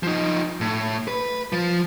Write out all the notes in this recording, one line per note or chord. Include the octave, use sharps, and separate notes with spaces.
F3 D#4
A2
B4
F3